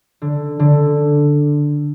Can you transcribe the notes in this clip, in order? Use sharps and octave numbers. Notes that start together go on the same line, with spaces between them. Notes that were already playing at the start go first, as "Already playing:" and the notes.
D3
D3